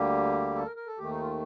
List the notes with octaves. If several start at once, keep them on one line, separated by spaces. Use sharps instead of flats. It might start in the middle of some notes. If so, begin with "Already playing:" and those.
Already playing: D2 D3 G3 A#3 G4
A4
A#4
A#4
A4
D#2 D#3 A3 G4
D#4
F4